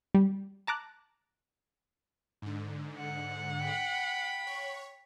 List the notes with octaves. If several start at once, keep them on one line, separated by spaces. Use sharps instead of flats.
G3
A5 A#5 D6 F#6
G#2 D3
F#5
G5 B5
C#5 C#6